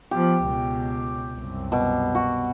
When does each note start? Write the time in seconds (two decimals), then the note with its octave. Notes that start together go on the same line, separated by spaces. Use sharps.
0.11 F3 B3 G4
0.44 C#2 B2
1.36 C2 F#2
1.72 B2
2.15 F#4